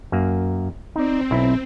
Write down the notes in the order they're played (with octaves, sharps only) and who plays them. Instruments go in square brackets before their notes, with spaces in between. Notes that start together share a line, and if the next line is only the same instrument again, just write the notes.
[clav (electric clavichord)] F#2 A#3
[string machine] C4 [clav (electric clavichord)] D#4 D5
[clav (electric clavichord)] B1 E4